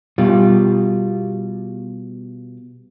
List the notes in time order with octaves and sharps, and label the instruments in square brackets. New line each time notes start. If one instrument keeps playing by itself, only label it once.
[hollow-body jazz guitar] B2 G3 F4